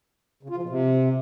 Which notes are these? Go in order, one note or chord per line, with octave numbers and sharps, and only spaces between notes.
C#3
F4
F3
B2
C3